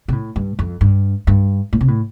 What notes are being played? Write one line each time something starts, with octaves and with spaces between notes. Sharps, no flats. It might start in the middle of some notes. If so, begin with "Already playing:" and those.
C3
A2
G2
F2
G2
G2
A2
C3
A2